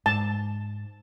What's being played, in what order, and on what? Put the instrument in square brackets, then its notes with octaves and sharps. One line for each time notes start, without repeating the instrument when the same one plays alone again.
[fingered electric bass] G#2 [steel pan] A5